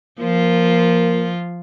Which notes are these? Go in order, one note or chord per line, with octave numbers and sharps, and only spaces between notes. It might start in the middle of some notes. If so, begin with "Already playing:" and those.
F3 A#3 F4